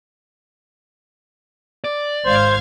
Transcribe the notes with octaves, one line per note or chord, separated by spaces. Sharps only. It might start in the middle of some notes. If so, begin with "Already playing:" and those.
D5
G#1 C5 F5 G#6